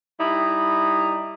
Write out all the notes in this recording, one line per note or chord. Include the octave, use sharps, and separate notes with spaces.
G3 D#4 E4